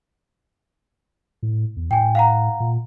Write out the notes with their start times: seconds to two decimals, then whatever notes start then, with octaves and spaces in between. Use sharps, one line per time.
1.43 A2
1.77 E2
1.91 A2 G5 G#5
2.15 F5 F#5 A#5
2.60 A#2